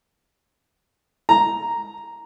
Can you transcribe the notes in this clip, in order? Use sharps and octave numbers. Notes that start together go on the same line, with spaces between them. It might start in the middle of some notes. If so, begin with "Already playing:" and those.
A#5